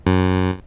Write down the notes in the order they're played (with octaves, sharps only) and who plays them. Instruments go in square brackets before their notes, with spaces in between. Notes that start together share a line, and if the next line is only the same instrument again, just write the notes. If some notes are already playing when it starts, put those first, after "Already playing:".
[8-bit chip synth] F#2